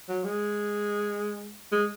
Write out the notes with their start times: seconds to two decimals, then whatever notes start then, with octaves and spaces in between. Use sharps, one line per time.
0.09 F#3
0.24 G#3
1.72 G#3